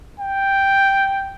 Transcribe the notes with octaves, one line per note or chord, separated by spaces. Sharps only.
G5